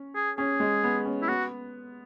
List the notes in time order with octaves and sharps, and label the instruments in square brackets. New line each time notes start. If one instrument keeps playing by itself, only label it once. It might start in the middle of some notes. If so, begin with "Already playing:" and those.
Already playing: [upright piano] C#4
[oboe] G#4
[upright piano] C#4 [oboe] G#4
[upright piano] G#3
B3
C#4
[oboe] E4
[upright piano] B3 [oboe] F#4